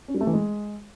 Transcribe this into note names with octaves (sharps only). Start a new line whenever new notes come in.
C#4
G3
A3
E3
G#3